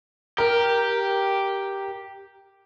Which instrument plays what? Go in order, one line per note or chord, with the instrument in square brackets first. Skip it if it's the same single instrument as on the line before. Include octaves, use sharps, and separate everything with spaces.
[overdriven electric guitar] G4 [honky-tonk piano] A#4